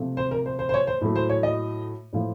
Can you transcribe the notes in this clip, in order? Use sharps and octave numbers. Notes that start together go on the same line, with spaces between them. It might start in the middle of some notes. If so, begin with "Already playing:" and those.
Already playing: C3 F3 A3
C5
A#4
C5
C5
C5
C#5
C5
A2 F#3 A3
C5
C#5
D#5
A2 F3 A3